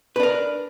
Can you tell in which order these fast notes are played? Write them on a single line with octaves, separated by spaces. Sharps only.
B4 D4 A#4